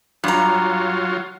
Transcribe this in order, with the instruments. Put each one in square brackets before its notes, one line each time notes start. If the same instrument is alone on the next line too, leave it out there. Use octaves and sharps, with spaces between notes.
[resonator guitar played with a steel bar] G2 A#5 [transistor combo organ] F#3 F4